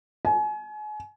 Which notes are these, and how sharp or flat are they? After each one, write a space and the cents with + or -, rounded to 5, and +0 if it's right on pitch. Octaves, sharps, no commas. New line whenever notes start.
G#5 +35